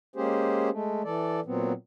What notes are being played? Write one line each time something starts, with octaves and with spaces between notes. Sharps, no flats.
G#3 A#3 C#4 G4 G#4 C5
G#3 A3
E3 A4 D5
A#2 F#3 B3 C4